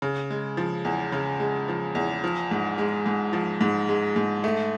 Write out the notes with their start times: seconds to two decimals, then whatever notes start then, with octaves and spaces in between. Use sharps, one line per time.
0.02 C#3
0.30 G#3
0.57 F3
0.85 E2
1.12 C#3
1.40 G#3
1.68 F3
1.95 E2
2.24 F3
2.51 G#2
2.78 G#3
3.06 G#2
3.33 F3
3.61 G#2
3.89 G#3
4.16 G#2
4.44 A3